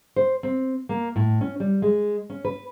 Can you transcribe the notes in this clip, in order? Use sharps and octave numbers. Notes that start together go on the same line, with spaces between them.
C5
C4
A#3
A2
C#4
G3
G#3
C#4
B4